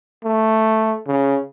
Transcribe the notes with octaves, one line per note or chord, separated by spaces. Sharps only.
A3
C#3